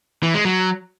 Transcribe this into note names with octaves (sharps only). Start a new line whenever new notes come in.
E3
G#3
F#3